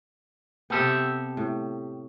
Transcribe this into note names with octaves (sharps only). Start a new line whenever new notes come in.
C3 B3 G4 A4
A2